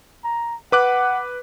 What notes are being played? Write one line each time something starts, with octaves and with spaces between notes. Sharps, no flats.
A#5
B4 F#5 D6 F#6